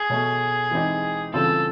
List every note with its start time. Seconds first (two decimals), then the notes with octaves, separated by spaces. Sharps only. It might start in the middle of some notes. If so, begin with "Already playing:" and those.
Already playing: G#4
0.09 B2 F#3 A3
0.71 E3 G#3 C4 D#4 G4
1.33 C#3 E3 G3 C4 F4 A4